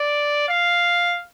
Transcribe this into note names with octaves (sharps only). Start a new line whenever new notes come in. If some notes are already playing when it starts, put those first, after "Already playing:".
Already playing: D5
F5